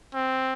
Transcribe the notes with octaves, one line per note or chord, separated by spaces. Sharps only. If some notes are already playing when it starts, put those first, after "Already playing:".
C4